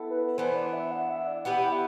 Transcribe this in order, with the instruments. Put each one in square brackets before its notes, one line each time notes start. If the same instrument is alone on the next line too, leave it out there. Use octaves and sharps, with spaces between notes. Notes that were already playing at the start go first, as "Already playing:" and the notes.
Already playing: [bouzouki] B3 E4 A4
[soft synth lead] B4
[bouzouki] E3 B3 D4 [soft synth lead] C5
[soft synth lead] D5
E5
F#5
E5
D5
[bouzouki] B3 E4 G4 B4 [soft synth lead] F#5
[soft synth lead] F#5
E5